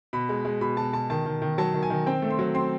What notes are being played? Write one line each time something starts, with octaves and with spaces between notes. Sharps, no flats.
B2 B5
G#3
G#3
B2 B5
B2 A5
B2 A5
D#3 A5
D#3
D#3
F#3 A5
D#3
G#5
D#3
C4 G5
A3
C6
F#3
C4 C6